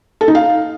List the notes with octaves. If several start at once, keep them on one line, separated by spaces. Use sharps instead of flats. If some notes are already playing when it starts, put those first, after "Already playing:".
A4
D#4
F5